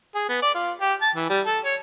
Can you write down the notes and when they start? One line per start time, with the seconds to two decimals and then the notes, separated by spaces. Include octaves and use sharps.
0.15 G#4
0.29 B3
0.42 D5
0.54 F4
0.81 G4
1.02 A5
1.16 E3
1.30 G3
1.46 A4
1.64 C#5